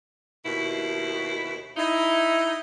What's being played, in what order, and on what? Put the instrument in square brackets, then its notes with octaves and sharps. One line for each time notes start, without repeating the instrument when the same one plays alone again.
[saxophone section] D#2 B2 E4
[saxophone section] D#4 [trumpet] E4